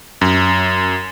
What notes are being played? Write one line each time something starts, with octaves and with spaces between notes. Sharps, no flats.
F#2